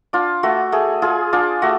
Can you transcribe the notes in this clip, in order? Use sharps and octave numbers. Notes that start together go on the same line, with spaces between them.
D4 F4
A3 F#4
A3 G#4
F4 G#4
D4 F4
A3 F#4